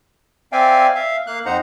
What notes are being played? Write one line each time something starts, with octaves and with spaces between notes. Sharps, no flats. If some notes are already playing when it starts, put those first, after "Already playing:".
C4 D5 E5 F5 G5 G#5
E5 F5
A#3 F5 F#6
F2 D#4 C5 F#5 A#5